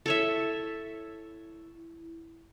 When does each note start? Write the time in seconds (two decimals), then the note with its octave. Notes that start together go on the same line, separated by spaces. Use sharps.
0.06 E4 A4 C#5 E5